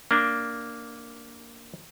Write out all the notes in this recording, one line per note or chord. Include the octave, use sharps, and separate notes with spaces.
A#3 D4